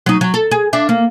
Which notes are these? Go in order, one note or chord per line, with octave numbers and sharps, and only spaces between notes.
F#3 D#4
F#3
A4
G#4
D4 E5
A#3